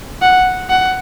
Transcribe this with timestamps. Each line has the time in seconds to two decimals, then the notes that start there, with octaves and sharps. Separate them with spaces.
0.22 F#5
0.70 F#5